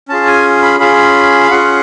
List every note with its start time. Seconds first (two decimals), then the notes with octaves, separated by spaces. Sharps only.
0.09 C#4 F4 G#4 A5
0.27 G#5
0.62 B5
0.79 C#4 F4 G#4 B5
1.44 F5
1.50 C#4 F4 G#4 F#5